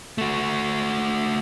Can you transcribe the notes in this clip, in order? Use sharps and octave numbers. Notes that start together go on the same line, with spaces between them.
A3 F#4